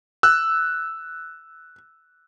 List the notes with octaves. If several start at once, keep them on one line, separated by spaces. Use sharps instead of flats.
E6 F#6